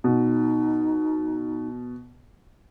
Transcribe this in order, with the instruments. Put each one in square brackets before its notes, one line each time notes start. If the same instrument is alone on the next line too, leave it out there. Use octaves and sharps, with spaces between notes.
[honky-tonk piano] B2 [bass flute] D#4